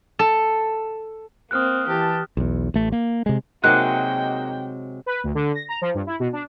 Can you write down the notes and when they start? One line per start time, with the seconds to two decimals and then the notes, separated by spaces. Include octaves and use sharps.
0.19 A4
1.51 A#3 C4 D#6 F6 F#6
1.87 E3 G4 A5
2.37 B1 E2
2.74 A1 A3
2.92 A#3
3.26 C3 G#3
3.64 C3 F#3 G#3 A#3 D#4 F#4 G5 F#6
5.06 B4
5.24 D2
5.35 D3
5.54 A#6
5.68 A#5
5.81 F3
5.94 G2
6.07 E4
6.20 B2
6.33 D4